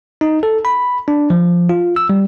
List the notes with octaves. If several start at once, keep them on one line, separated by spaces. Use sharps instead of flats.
D#4
A4
B5
D4
F3
F4
E6
G3